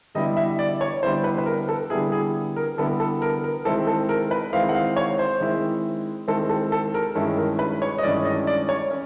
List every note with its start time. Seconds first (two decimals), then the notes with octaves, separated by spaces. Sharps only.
0.15 D3 G3 B3 E4 D#5
0.37 E5
0.59 D5
0.81 C#5
1.03 D3 G3 B3 E4 C5
1.24 B4
1.38 B4
1.46 A#4
1.69 A4
1.90 D3 G3 B3 E4 G#4
2.12 G#4
2.56 A#4
2.78 D3 G3 B3 E4 A4
3.00 A4
3.22 A#4
3.44 A#4
3.65 D#3 G#3 C4 E4 A4
3.87 A4
4.09 A#4
4.31 B4
4.53 D#3 G#3 C4 E4 F5
4.69 F#5
4.75 F5
4.96 C#5
5.19 C5
5.40 D#3 G#3 C4 E4
6.28 D#3 G#3 C4 E4 A4
6.49 A4
6.72 A4
6.94 A#4
7.15 G2 D#3 G#3 C#4 E4 A4
7.38 A#4
7.59 B4
7.82 C#5
7.98 D#5
8.03 G2 D#3 G#3 C#4 E4 D5
8.25 D#5
8.47 D5
8.69 C#5
8.91 C#4